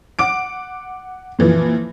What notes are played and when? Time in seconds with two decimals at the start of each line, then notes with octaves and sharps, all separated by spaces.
0.19 F#5 D6 D7
1.39 A#2 E3 F3